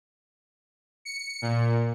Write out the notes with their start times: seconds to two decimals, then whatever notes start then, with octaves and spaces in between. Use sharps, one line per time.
1.05 C#7
1.42 A#2